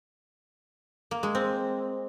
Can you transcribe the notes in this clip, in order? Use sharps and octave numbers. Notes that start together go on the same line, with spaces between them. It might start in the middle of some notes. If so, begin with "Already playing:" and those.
A#3
G#3
C4